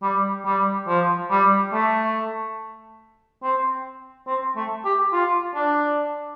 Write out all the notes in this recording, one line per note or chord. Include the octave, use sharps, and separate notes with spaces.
G3
G3
F3
G3
A3
C4
C4
A3
G4
F4
D4